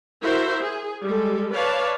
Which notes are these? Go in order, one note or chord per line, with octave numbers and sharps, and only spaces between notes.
E4 F#4 A#4 C5 E5
G#4
G3 G#3 A4
B4 C#5 D5 F5 A5